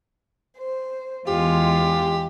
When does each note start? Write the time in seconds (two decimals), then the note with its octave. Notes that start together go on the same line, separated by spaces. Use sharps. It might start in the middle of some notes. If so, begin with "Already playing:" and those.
0.57 C5
1.27 E2 G#3 F4 G4